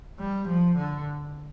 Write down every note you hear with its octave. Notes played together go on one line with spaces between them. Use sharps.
G3
F3
D3